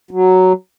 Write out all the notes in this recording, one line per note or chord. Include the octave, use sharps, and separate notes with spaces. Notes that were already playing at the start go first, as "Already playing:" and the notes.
F#3